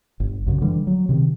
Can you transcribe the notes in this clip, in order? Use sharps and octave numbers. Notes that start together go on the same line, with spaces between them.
G1
B1 F#2 C#3
D3 E3 G3
F#3
C3 D#3